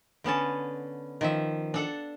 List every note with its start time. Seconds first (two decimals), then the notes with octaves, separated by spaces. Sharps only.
0.24 D3 B3 C#4 A5
1.21 D#3 F3 E5
1.74 D4 A4 F#5